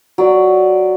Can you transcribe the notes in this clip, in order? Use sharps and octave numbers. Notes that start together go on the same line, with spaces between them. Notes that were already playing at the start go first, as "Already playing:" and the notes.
F#3 D5